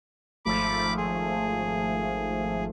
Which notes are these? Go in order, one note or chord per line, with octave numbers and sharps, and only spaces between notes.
G#1 F3 A3 B5 D6
G#4